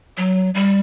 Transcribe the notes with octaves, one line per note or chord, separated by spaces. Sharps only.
F#3
G3